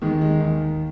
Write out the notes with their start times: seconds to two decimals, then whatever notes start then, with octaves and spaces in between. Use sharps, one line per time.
0.02 D#2 D#3 G#3
0.21 G#3
0.40 D#2 D#3